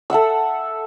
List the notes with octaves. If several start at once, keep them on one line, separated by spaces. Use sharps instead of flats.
A4 E5 F#5 E6